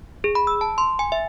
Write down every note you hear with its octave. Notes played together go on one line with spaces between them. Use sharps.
G#4
B5
E6
A5
C6
G#5
E5